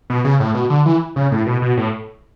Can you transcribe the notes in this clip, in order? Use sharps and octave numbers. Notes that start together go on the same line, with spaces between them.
B2
C#3
A2
B2
D3
E3
C#3
A2
B2
B2
A2